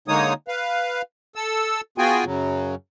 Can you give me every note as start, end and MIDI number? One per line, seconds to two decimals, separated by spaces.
0.08 0.33 50
0.08 0.33 56
0.08 0.33 58
0.08 0.33 63
0.08 0.33 73
0.08 0.33 87
0.48 1.02 71
0.48 1.02 77
1.36 1.81 69
1.36 1.81 88
1.98 2.24 59
1.98 2.24 65
1.98 2.24 66
1.98 2.24 68
1.98 2.24 79
1.98 2.24 80
2.25 2.75 42
2.25 2.75 49
2.25 2.75 54